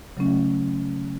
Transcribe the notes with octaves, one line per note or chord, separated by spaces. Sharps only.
C#3 F#3 A3 C#4